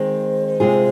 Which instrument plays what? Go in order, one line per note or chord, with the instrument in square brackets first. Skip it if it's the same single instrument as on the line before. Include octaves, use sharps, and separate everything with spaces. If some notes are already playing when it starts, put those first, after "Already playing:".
Already playing: [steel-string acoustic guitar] D#3 G#3 C4 [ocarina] C5
[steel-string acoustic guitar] C3 G#3 F4 G#4